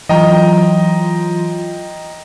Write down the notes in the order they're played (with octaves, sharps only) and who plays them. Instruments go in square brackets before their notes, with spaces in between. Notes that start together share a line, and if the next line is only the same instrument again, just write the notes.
[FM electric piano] E3 F#3 F4 [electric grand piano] D#5 G5 A#5